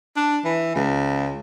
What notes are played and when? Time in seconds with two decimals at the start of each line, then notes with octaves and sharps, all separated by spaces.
0.16 D4
0.44 E3
0.75 C#2